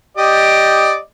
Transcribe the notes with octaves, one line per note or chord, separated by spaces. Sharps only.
G4 D5 D#5